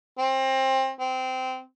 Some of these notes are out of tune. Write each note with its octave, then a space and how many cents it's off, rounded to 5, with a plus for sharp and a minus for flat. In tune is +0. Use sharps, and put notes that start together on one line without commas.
C4 +25
C4 -20